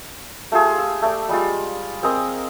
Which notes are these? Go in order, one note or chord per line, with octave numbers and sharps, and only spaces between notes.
A3 F4 G4 G#4
E6
A3 D5
G3 G#3 F4
C4 G#4 A#4 D#5